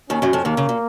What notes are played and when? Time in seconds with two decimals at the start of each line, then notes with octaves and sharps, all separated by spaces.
0.10 D#2 D#3 C#4
0.22 F#2 F#3
0.33 F2 F3
0.45 D#2 D#3 A#3
0.57 C#3
0.69 A#2